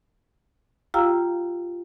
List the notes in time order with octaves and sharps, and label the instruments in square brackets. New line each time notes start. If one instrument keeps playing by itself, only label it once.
[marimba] F4 G4 F5 G5 A#5 E6